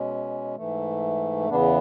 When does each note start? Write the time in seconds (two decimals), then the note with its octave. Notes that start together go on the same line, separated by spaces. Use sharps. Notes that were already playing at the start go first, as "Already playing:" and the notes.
Already playing: B2 G#3 C#4
0.56 G#2 E3 A3
1.49 E2 C#3 E3 B3 D4